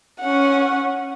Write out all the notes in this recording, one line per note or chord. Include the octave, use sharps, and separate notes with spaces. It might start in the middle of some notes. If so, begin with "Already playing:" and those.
C#4 F#5